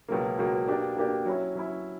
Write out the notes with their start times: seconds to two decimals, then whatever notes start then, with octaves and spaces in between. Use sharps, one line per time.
0.08 C#2 B2 F#3 A#3
0.38 C#2 B2 F#3 A#3
0.67 B2 A#3 D4 G4
0.96 B2 A#3 D4 G4
1.25 F#3 C#4 E4
1.55 F#3 C#4 E4